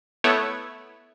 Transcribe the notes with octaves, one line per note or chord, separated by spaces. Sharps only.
A3 B3 E4 C#5